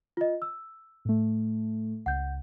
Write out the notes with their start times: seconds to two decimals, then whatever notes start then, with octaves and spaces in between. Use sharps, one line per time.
0.17 F4 D#5
0.42 E6
1.05 A2 A3
2.06 C#2 F#5 G6